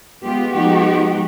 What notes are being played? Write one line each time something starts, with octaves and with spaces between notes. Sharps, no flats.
G#3 B3 F4 G4
F3 G#3 B3 D#4 F#4 G4